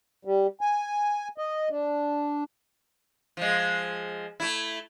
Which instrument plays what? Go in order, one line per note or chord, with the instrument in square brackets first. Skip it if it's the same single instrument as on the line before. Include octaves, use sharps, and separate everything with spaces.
[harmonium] G3
G#5
D#5
D4
[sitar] F3 G#3
A3 E4